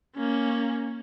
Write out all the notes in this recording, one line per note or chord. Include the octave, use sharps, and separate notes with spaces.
A#3 C#4